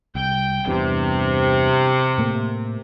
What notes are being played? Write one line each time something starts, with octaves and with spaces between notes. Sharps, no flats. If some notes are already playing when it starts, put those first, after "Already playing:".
C2 G5
E2 G2 C3
A2 A3 A#3